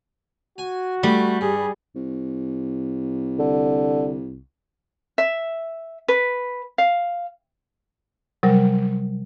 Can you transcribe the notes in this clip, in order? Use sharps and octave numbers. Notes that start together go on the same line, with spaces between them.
F#4 G#5
G3 A3 D6
G2 G#4
C2
D3
E5
B4
F5
C3 F#3 G3 A#4